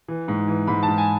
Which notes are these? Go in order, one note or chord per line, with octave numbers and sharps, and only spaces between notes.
E3
G#2
E3
G#2 B5
A5
G#2
G#5